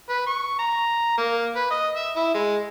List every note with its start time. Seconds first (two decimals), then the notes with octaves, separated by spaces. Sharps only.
0.09 B4
0.27 C#6
0.59 A#5
1.17 A#3
1.55 B4
1.70 D#5
1.96 E5
2.16 E4
2.34 G#3